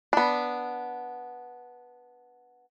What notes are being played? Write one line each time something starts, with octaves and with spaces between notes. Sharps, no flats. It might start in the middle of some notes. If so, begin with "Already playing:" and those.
B3 D4